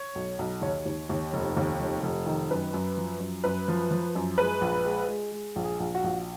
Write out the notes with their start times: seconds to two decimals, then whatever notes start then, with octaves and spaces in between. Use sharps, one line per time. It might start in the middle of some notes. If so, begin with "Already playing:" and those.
Already playing: C#5
0.15 B1
0.39 B1
0.62 D#2 C#5
0.86 D#2
1.09 D#2
1.33 F1
1.57 D#2
1.80 F1
2.03 F1
2.26 D#3
2.50 F#2 B4
2.74 F#2
2.97 F3
3.20 F#2
3.44 F#2 B4
3.68 F3
3.91 F3
4.15 F#2
4.38 G#3 B4
4.61 A#1
4.85 G#3
5.08 G#3
5.32 G#3
5.56 A#1
5.64 G#4
5.80 A#1
5.95 F#4
6.04 A#1